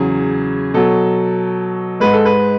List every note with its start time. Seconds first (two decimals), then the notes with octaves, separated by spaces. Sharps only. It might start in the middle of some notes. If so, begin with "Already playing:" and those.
Already playing: E2 C#3 F#3 G#4
0.74 B2 F#3 A4
2.00 G#2 G#3 B4
2.13 A4
2.25 B4